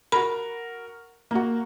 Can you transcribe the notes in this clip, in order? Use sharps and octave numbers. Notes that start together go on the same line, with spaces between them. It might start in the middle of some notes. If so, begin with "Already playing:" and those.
F#4 A#4 B5
A#3 F#4